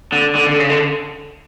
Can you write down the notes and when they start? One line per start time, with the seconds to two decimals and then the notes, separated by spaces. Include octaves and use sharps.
0.12 D3
0.35 D3
0.47 D3
0.59 C#3
0.70 D3